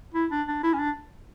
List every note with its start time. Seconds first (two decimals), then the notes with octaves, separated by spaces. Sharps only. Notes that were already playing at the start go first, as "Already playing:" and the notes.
0.14 E4
0.31 D4
0.48 D4
0.63 E4
0.74 C#4
0.79 D4